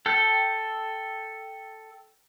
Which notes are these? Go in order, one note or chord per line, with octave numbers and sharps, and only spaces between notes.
A4 G5